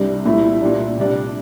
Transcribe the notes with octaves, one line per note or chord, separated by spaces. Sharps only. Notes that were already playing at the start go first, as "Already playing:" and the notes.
Already playing: C2 C3 G3 D4
C2 A#2 A3 E4
A#2 G3 D4
C3 G3 D4